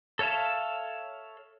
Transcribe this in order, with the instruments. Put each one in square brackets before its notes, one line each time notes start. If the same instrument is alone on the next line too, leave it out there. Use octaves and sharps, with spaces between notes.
[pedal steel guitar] A4 C#5 E5 F5 A5